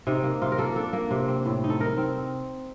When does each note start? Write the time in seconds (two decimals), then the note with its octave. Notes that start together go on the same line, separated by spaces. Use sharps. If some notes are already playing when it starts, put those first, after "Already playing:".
0.07 C3 D#4
0.23 A#3
0.42 C3 F4
0.52 A#4
0.58 A#3 A4
0.76 D4 A4
0.93 A#3
1.10 C3
1.28 C4
1.46 A2
1.64 D#4
1.70 A4
1.80 D#4 A#4
1.97 C4